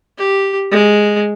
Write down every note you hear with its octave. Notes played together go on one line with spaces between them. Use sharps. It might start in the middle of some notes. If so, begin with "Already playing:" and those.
G4
G#3